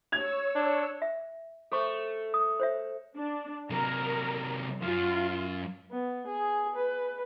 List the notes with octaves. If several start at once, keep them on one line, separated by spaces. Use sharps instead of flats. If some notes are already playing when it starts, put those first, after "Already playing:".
C#5 E6 G#6 F7
D4
E5
A3 A4 C5 C#6
D#6
C5 C#5 E5
D4
C3 F#3 A#4 A#5
F#2 F4
B3
G#4
B4